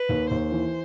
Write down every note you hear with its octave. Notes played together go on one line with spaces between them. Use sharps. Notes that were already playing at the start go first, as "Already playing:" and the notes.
Already playing: B4
D#2
D#2 C5
E3